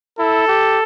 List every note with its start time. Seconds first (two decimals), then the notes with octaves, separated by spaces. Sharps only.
0.19 E4 A4
0.48 G4